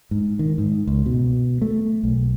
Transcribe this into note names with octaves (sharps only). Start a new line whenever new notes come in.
G#2
D#3
G#2
C#2
B2
A3
B1